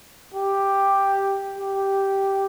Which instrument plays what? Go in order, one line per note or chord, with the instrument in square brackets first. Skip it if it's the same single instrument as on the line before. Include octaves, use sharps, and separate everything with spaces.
[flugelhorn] G4
G4